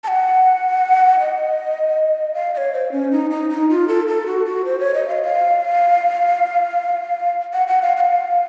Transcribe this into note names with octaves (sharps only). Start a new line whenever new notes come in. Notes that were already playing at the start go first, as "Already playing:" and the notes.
A5
F#5
D#5
F5
D#5
C#5
C5
C#4
D#4
D#4
D#4
F4
A4
A4
F#4
F#4
C5
C#5
D#5
F5
F5
F#5
F#5
F5
F#5
F5